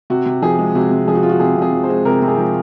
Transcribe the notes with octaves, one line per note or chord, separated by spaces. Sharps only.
C3 F#4
C3
F3 G#4
G#3
C3 F#4
C3
F3 G#4
F#4
G#3 F4
F#4
C3 G#4
C3
G#4
F3
C5
G#3
C3 A#4
C3
G#4
F3